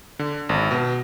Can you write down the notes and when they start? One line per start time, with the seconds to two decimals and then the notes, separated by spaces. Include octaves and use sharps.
0.19 D3
0.49 G#1
0.71 B2